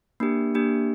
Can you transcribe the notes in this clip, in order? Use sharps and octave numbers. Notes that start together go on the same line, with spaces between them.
A#3 D4 G4
A#3 D4 G4